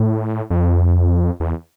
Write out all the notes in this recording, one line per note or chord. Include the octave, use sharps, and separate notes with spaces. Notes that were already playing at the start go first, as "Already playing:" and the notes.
Already playing: A2
F2
E2